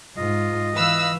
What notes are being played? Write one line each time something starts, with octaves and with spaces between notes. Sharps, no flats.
G#2 F4 D#5
E3 B4 F5 E6